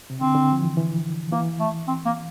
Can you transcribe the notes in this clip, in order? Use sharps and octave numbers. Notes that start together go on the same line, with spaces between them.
C3
D3 C4
D3
F3
E3
E3
E3 A#3
A3
C4
A#3